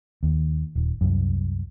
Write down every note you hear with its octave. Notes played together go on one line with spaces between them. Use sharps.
D#2
D#1
C2 F#2